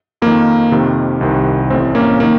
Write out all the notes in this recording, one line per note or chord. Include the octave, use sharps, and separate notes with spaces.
F2 D#3 A#3
F2 C3 D#3
C2 C3 D#3
A1 A2 C4
A#3 C#4
D#3 A#3